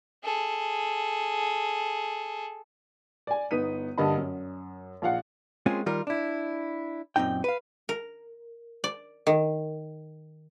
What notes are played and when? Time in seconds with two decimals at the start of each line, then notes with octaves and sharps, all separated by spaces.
0.24 G#4 A4
3.27 D5 G#5
3.51 G1 B3 D#4 B6 D#7
3.98 G2 D3 A#3 D#5 A5 B5
4.18 F#2
5.02 A#1 F4 F5 F#5
5.66 G#3 A#3 C4 C#4 F4 G#4
5.86 D#3 G3 F4 A#4
6.07 D4 E4
7.16 F#2 A#2 C4 D#4 G5
7.44 B4 F5
7.89 A#4
8.84 D5
9.27 D#3